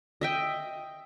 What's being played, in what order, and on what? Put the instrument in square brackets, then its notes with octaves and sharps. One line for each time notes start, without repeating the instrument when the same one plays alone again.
[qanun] D#5 E5 G5